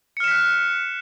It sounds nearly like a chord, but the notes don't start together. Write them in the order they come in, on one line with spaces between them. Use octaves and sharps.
C#7 F6 E7 B6 F#6